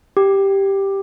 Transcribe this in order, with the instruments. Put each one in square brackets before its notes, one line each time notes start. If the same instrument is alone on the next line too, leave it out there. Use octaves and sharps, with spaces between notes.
[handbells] G4